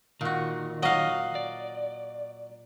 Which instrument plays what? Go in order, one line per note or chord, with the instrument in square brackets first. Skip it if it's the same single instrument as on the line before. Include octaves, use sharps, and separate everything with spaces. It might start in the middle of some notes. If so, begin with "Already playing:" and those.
[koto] A#2 F#4 [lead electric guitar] D#3
[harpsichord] F#3 [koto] D#5 F5
[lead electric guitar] D5